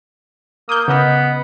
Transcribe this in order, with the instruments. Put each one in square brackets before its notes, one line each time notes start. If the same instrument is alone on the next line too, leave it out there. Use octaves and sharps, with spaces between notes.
[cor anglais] A#3 [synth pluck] D#6 G6
[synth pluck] C#3 D#5 [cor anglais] B3